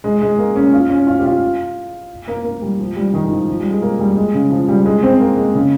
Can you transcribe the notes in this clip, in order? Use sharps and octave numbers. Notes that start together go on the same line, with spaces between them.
G#3
G#3
A#3
C#4
F4
C#4
F4
G4
F4
A#3
A#3
G3
F3
G3
D#3
D#3
F3
F3
G3
G#3
A#3
G3
G#3
C#3
F3
G3
G#3
C4
A#3
G#3
C#3